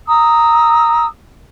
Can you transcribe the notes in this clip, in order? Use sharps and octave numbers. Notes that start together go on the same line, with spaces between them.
A#5 D#6 E6